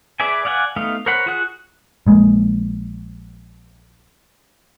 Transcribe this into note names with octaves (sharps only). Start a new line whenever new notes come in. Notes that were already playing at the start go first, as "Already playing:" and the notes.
G#4 B4 D5 E5 G#5
D5 F5 F#5 G#5
A3 B3 D#4 F5
A#4 C5 C#5 F#5 B5
F4 F#4 G#4 F#5 F#6
A#1 G#3 A#3